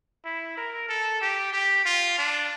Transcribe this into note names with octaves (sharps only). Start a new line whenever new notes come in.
E4
A#4
A4
G4
G4
F4
D4